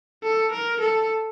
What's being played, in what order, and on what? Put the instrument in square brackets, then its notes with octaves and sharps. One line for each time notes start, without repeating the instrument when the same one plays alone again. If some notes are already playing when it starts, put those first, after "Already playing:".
[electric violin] A4
A#4
A4